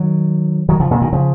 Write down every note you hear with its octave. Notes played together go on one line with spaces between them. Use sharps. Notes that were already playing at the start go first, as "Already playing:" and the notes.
Already playing: D#3 F#3
D#3 F#3
C#3 F3
A#2 C#3
B2 D#3
C#3 F3